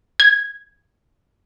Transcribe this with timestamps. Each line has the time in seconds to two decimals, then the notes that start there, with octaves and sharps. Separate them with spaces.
0.20 G#6